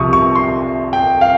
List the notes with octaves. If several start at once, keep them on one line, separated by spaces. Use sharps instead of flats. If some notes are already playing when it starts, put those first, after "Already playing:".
Already playing: C2 C3 F3 C#6 D#6
C#6
C6
G5
F5